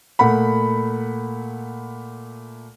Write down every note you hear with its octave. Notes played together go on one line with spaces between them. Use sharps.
A#2 A3 F#5 B5